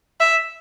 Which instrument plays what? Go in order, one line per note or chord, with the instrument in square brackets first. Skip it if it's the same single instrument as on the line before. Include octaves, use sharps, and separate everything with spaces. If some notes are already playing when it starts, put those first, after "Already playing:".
[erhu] E5